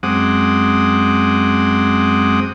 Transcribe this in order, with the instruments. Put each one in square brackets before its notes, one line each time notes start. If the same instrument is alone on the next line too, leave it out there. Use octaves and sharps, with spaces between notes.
[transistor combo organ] F#2 G#3 C4 F#5 D6 D#6